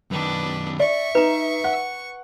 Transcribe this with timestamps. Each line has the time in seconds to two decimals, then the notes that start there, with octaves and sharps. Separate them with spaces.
0.11 F#2 D#3 D4 B4
0.80 D5 E5 C#6
1.15 D#4 B4 A#5
1.64 F#5